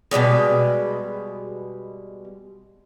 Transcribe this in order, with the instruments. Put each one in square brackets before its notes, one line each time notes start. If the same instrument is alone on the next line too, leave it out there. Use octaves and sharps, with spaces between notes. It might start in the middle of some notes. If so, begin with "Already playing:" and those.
[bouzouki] B2 E3 G3 G#3